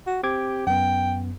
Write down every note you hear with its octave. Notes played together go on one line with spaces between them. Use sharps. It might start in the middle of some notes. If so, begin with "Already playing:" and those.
F#4
C4 G4 D6 G#6
F#2 B3 G5